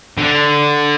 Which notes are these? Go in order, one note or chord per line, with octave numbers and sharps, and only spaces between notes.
D3